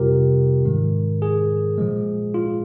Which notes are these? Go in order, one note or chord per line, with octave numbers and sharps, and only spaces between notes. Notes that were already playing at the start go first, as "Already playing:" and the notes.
Already playing: F2 C3 G3 F4 G4 A#4
G#2 D#3 G#3
G#4
A#2 F3 G#3
F4